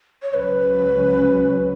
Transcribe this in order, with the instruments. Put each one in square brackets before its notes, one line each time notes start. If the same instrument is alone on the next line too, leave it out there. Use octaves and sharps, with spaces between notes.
[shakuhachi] C#5
[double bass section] C#2 C#3 F#3 C#4 [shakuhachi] B4